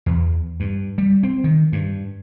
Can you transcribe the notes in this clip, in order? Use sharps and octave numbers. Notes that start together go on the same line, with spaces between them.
E2
G2
G3
C4
D#3
G2